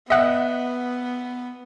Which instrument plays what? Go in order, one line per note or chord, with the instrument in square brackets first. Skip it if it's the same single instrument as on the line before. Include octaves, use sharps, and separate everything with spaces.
[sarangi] B3 [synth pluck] D#5 F#5 [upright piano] E5